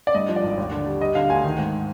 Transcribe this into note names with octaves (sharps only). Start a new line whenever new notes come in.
D5
G2 D#5
F3
D5
G#1
D#2
D3
G3
G3 D#5
D3 F5
D2 G#5
D#3
G#2